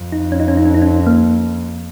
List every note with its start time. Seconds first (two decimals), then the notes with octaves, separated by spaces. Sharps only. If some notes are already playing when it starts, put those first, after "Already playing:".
Already playing: F2
0.12 D#4
0.32 C#4
0.40 D#4
0.48 C#4
0.57 D#4
0.66 C#4
0.74 D#4
0.82 C#4
1.07 A#3